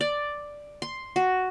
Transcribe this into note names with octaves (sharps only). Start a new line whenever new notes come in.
D5
C6
F#4